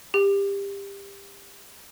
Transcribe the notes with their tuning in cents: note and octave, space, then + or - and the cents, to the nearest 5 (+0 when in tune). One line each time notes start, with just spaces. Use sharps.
G4 +25